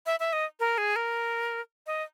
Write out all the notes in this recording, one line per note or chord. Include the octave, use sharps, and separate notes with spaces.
E5
E5
D#5
A#4
G#4
A#4
D#5